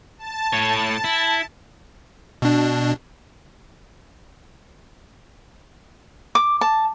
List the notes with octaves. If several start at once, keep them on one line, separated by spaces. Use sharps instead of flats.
A5
A2 C#5
E4
B2 D4
D6
A5